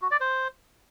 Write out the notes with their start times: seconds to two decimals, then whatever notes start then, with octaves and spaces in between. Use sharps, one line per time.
0.02 F#4
0.11 D5
0.20 C5